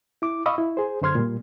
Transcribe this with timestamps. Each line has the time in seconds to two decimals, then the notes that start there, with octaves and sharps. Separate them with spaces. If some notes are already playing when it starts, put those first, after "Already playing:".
0.22 E4 D6
0.46 D#5 F5 B5 C#6 D#6 E6
0.58 E4
0.77 G#4 C5
1.02 F#2 D3 C5 C6 F6 G#6
1.15 A#2 G3